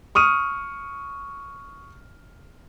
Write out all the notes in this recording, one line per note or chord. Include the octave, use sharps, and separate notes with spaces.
C#6 D#6 F6 D#7